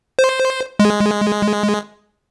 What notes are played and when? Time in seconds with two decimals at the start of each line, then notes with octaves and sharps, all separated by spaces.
0.19 C5
0.79 G#3